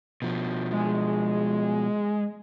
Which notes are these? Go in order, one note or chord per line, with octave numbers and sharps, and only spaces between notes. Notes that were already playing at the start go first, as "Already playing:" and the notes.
B2 F3
G#3